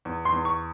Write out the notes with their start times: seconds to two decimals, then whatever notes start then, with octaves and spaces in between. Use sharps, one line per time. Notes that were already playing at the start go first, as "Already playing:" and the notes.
0.05 E2
0.25 C6
0.32 E2
0.45 C#6